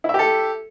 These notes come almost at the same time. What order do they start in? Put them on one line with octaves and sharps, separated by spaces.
E4 E5 G4 A4